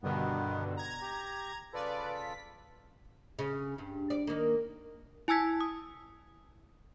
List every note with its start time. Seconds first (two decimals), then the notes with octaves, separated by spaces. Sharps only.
0.03 G2 B2 D3 D#3 B3
0.77 A#5 G#6
1.01 G4
1.73 C#3 F4 A4 B4 D5
2.15 B6
3.39 C#3
3.78 G2
4.10 D5
4.27 D#3 A#3
5.28 E4 G#5 A5 E6 G#6 B6
5.61 D#6